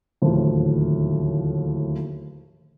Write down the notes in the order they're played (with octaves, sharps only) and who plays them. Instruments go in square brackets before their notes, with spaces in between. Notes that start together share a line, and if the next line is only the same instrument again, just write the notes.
[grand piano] D1 D#2 A2 F3